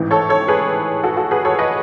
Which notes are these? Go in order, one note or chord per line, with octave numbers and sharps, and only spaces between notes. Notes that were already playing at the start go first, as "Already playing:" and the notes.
Already playing: A1 G#2 E3
A4 C#5
A4 C#5
G#4 B4
F#4 A4
F#4 A4
G#4 B4
A4 C#5
B4 D#5